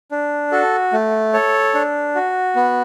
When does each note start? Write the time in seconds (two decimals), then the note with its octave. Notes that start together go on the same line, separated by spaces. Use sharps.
0.11 D4
0.52 F#4 A4
0.93 A3
1.33 A4 C#5
1.74 D4
2.15 F#4
2.56 B3